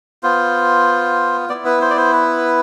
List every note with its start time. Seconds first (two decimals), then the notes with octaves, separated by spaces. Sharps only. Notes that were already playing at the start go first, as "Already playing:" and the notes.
0.23 B3 F4 C5
1.49 B3 E4 D5
1.65 B4
1.81 C5
1.90 D5
1.97 C5
2.12 B4